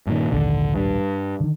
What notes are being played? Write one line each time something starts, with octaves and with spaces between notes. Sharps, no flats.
G2 A#2 D#3
A#1 D#2 G#2 D3
G2
D3 D#3